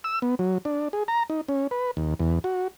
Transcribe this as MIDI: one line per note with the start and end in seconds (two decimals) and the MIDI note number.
0.04 0.19 88
0.22 0.35 59
0.39 0.58 54
0.65 0.88 62
0.93 1.03 68
1.08 1.23 82
1.30 1.41 63
1.48 1.67 61
1.71 1.91 71
1.97 2.14 39
2.20 2.39 40
2.44 2.68 66